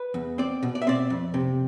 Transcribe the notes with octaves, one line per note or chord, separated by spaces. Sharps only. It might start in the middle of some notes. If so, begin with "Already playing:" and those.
Already playing: B4
E2
C4 D5
B2
D5
E5
C4 D5
F2
C3